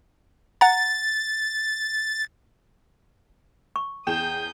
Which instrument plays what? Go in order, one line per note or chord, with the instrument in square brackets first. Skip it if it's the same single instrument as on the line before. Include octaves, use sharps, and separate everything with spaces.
[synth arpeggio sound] F#5 A#5 [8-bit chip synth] A6
[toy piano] C#6
[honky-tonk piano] E2 G#4 E7 [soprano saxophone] G5 [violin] D#6 G6